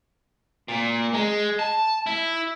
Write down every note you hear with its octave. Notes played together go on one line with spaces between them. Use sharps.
A#2
G#3
A5
E4